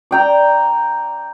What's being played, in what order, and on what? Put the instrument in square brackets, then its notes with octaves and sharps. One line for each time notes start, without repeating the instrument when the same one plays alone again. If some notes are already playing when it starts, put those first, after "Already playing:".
[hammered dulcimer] D5 G5 A#5